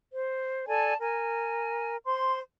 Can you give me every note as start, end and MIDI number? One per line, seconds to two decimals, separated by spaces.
0.12 0.66 72
0.67 0.94 69
0.67 0.94 74
0.67 0.94 80
0.67 0.94 81
1.00 1.97 70
1.00 1.97 80
2.06 2.40 72
2.06 2.40 84